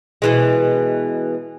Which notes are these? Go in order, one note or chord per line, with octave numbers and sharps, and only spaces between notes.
B2 E3 G#3